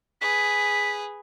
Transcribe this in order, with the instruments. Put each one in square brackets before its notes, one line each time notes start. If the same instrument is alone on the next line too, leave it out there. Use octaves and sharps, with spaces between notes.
[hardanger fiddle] G#4 B4 [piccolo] B6